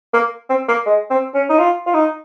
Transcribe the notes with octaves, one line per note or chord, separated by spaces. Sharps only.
A#3
C4
A#3
G#3
C4
C#4
D#4
F4
F4
D#4